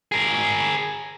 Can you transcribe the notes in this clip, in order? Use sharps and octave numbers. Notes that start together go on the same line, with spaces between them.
G#4 A#4